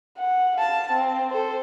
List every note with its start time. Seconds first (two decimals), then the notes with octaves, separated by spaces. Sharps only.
0.18 F#5
0.57 F5 A5
0.91 C4
1.31 A4 C5